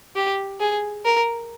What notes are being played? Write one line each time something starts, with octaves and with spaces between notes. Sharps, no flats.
G4
G#4
A#4